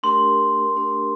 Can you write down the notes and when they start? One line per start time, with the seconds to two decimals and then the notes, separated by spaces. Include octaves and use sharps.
0.03 A3 D4 G4 A#4 C6
0.76 A3 D4 G4 A#4